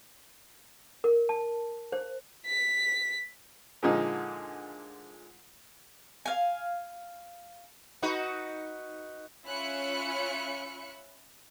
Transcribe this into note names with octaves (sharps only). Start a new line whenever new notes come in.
A#4
A5
C5
B6
A#2 D3 F3 G#3 D#4
F5 G#5
D#4 F#4 B4
C#4 F4 E5 B5 F#6 C#7